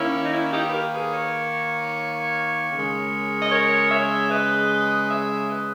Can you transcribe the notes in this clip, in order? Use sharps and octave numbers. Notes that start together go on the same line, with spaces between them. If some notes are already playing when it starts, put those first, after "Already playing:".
Already playing: D#3 A#3 C#4 E4
D#4
C#4 E4
D#4 G4
B4
G4 A#4
G#4 B4
A#4 C#5
C#3 G#3
D#5
A#4 C#5
C#5 E5
B4 D#5
C#5 E5
B4 D#5